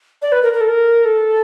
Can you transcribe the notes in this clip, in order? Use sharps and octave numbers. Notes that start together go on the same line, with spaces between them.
D5
B4
A#4
A#4
A4
A#4
A4